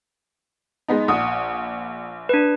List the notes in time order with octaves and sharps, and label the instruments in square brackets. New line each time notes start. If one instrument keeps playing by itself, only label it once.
[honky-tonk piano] G#3 B3 D#4
[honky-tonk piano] A#1 D#6 [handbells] F#5
[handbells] D4 B4